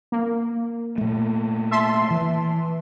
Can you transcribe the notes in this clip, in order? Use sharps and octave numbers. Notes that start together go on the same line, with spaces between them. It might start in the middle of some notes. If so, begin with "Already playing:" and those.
A#3
A#2 A3
E5 A5 C6
E3